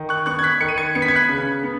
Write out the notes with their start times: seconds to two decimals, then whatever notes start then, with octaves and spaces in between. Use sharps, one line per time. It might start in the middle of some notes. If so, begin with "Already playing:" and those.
Already playing: D#3
0.09 C#6 F#6
0.26 B3 C#6 F#6
0.39 G#6
0.43 F#6 B6
0.61 D#3 C#7
0.69 D#7
0.78 G#6 C#7
0.95 B3 C#7
1.02 B6
1.08 G#6
1.15 F#6 B6
1.29 C#3
1.63 B3